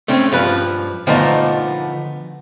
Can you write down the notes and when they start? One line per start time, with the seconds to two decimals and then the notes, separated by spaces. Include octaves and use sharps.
0.08 A3 C4 C#4
0.32 G2 F3 B4
1.07 D3 F3 A3 B3 D#4